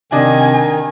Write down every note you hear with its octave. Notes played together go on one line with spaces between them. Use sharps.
C3 D#3 D4 D#5 G#5